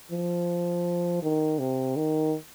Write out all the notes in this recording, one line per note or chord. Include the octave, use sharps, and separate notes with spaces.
F3
D#3
C3
D#3